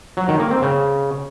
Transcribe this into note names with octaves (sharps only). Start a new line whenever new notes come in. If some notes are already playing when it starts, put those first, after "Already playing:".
F#3
D#3
A#3
C4
C#3